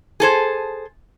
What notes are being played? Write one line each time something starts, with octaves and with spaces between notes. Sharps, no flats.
G#4 A4 C5